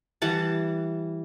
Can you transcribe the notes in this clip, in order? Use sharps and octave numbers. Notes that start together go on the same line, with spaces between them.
E3 G3 F#5 A5